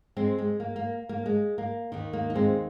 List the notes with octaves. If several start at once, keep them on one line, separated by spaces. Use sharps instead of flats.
G#3 C4
G#3
A#3
A#3
A#3
G#3
A#3
D#2 D#3
A#3
D#4
G#3 C4